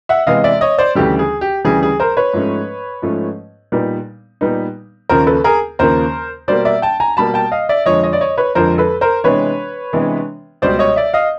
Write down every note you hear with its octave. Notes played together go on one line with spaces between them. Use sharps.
E5 F#5
C3 E3 G#3 B3 D#5 F5
D5 E5
C#5 D#5
C5 D5
D2 C#3 E3 G3 G4 A4
G#4
G4
D2 C#3 E3 G3 G#4
G#4
A#4 C5
B4 C#5
G#2 F3 A3 C#4
G#2 F3 A3 C#4
A#2 G3 B3 D#4
A#2 G3 B3 D#4
D#2 C#3 F3 A#3 A#4 C5
A4 B4
G#4 A#4
D#2 C#3 F3 A#3 A#4 C5
B2 G3 A#3 C5 D5
D5 E5
G5 A5
G#5 A#5
B2 G3 A#3 A5 B5
G5 A5
D#5 F5
D5 E5
F2 D3 F3 G#3 C#5 D#5
C#5 D#5
D5
C#5 D#5
B4 C#5
F2 D3 F3 G#3 A#4 C5
A4 B4
A#4 C5
C3 E3 G#3 B3 D4 B4 C#5
C3 E3 G#3 B3 D4
C#2 B2 G3 C5 D5
C#5 D#5
D5 E5
D#5 F5